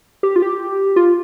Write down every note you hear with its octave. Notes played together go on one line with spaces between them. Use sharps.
G4
F4
G4
F4